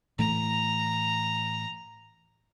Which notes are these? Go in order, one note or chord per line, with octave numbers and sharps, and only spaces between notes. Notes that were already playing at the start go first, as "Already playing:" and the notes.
A2 E3 A3 A#5